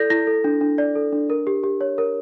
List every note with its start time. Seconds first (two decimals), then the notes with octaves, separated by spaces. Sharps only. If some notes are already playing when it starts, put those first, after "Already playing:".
Already playing: E4 A4 D5 G6 A#6
0.10 E4 A#6
0.27 A4
0.44 D4
0.61 D4
0.78 D5
0.96 A4
1.13 D4
1.30 A#4
1.47 G4
1.64 G4
1.81 C#5
1.98 A#4